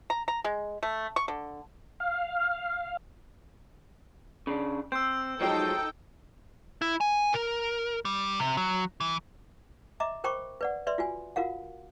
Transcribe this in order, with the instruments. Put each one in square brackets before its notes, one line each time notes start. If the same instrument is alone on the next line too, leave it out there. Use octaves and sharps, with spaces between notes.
[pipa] A#5
A#5
G#3
A3
C#6
D3
[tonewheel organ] F5
[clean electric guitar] C#3 D4
[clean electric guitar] C4 [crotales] E6 G6
[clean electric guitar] F3 F#3 G#3 [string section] D#4 A4 G5
[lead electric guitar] E4
G#5
A#4
G3
C3
F#3
E3
[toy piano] D#5 E5 A#5 D6
A#4 C5 G5 B5 C#6 D6
B4 D5 F#5
B4 D5 E5 C6
F4 F#4 G#5
F4 F#4 A#4 F5 F#5